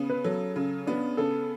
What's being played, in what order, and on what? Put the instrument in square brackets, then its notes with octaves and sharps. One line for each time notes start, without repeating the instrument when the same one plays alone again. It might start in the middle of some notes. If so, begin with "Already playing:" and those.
Already playing: [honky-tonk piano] C#3 B3
[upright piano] B4
[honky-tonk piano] F#3 [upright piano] A4
[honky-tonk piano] C#3
[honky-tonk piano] B3 [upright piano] D4
[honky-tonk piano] C#3 [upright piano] A4